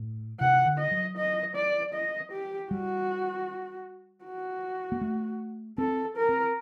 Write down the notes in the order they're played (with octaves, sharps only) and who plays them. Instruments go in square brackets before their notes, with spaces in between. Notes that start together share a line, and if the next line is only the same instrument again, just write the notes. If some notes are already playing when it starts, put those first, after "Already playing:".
Already playing: [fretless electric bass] A2
[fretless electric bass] C3 [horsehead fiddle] F#5
[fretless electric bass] D3
[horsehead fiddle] D#5
[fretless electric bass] F#3
[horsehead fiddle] D#5
D5
D#5
G4
[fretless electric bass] G3 [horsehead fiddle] F#4
[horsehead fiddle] F#4
[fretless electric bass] A#3
A3
[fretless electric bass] C4 [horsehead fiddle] A4
[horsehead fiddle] A#4
[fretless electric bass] C4